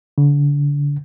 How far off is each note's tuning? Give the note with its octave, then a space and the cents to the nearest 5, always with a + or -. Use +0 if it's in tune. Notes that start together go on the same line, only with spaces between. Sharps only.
D3 -30